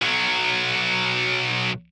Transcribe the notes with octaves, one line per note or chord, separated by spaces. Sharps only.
B1 F#3